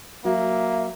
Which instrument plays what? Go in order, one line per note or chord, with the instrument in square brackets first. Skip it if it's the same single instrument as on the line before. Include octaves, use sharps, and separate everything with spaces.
[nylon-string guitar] F#3 F#4 [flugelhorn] A#3 [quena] E5